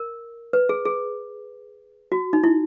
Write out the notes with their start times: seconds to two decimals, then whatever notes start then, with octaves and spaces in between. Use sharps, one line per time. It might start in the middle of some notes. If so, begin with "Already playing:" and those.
Already playing: A#4
0.53 B4
0.69 G#4
0.85 G#4
2.12 F#4
2.33 D#4
2.44 E4